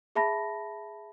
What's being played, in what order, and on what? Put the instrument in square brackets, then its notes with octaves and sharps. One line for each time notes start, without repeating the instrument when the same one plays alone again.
[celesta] G#4 E5 A5 B5 A#6